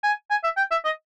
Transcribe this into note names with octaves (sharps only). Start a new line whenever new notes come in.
G#5
G#5
E5
G5
E5
D#5